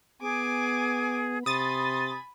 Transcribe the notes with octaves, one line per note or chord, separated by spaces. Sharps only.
B3 G#4 G#5 D6
C3 G#5 B5 C6 D#6 A6